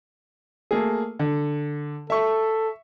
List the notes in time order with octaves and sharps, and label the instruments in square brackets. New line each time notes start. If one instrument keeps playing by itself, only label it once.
[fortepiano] A3 A#3 G#4
D3
[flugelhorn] A4 [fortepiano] E5 C#6